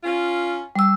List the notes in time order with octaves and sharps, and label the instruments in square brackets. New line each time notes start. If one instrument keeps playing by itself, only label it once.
[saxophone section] C#4 F4
[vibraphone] G3 E6